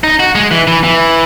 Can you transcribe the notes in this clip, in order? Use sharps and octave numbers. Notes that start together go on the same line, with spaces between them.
D#4
F#4
G#3
E3
E3
E3